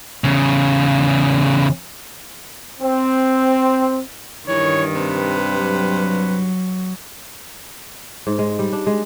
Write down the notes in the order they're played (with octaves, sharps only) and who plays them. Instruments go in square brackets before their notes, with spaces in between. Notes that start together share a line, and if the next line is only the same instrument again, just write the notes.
[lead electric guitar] E2 C#3
[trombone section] C4
[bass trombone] G2 [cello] D#3 [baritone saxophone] E3 [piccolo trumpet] C#5
[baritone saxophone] C3 [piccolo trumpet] B4
[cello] F#3
[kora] G#2
G#3
G3
D4
G#3